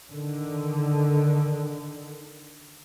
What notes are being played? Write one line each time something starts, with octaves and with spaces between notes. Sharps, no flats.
D3 D#3